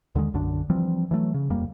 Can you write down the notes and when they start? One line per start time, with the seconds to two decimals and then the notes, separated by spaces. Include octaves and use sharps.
0.15 D#2 D3 D#3 G#3
0.33 B1 F#2 D3 D4
0.70 E3 F3 G3 C4
1.11 E3 F#3 A3
1.34 C#3
1.50 D#1 F2 G3 A#3